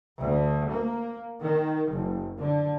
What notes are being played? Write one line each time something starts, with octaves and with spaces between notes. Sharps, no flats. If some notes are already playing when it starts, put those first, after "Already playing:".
D2
A#3
D#3
F#1
D3